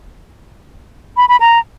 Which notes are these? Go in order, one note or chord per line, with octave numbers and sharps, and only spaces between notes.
B5
B5
A#5